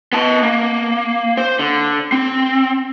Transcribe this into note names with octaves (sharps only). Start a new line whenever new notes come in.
B3 A5
A#3
C5
D3
C4